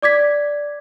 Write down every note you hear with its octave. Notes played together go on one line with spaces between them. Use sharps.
D5 D6 G#6 B6